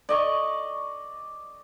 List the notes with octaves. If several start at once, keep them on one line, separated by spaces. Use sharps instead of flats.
D5 D#5 C#6